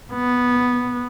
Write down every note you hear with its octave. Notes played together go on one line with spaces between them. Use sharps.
B3